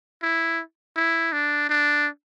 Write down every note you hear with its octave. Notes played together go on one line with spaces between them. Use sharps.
E4
E4
D4
D4